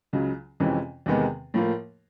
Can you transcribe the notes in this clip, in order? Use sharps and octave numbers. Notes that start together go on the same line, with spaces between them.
C#2 C#3 F#3
F2 C3 E3 G#3 C#4
E2 C3 D#3 G#3 B3
A2 F3 A#3